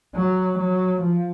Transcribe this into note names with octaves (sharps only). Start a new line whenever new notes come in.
F#3
F#3
F3